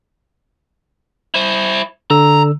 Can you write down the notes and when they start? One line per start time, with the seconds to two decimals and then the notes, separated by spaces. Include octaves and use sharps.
1.34 E4 C5
2.10 D3 A#5 E6